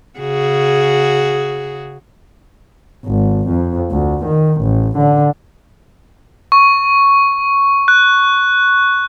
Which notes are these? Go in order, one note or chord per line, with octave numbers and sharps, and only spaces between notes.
C#3 F#4 G#4
G#1
F2
D2
D#3
A1
D3
C#6
F#6